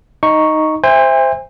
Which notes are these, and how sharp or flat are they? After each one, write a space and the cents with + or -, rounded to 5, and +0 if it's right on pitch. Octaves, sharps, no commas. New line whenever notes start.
D#4 +0 C#6 +0
C5 +0 E5 +0 G#5 -45